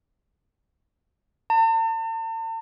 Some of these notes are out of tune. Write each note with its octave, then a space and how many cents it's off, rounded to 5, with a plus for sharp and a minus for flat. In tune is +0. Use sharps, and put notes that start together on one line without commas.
A5 +45